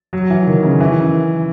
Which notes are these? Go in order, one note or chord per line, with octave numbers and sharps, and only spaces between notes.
F#3
E3
D#3
C#3
E3